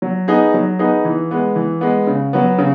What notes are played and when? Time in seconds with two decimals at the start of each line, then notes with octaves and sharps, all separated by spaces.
0.02 F#3
0.28 B3 D#4 G#4
0.54 F#3
0.79 B3 D#4 G#4
1.05 E3
1.31 G#3 B3
1.56 E3
1.81 G#3 B3
2.07 C#3
2.33 F#3 B3
2.58 C#3